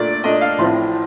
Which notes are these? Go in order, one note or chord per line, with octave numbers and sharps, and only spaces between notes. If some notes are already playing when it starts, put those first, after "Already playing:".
Already playing: A#2 A3 D4 D5
A#2 A3 D4 D#5
F5
A1 A2 F3 C4 C6